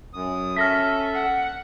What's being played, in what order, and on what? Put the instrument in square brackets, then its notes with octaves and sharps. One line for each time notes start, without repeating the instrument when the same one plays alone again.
[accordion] F#2 D#6
[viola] C#4 [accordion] A4 E5 [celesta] F6 A#6 B6
[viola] F#5